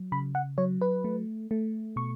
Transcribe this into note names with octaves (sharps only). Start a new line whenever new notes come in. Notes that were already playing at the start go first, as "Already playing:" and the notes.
Already playing: F#3
C#3 B5
F#5
F#3 C#5
B4
A3
A3
B2 C#6